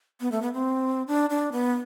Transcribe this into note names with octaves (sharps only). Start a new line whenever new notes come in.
B3
A3
B3
C4
D4
D4
B3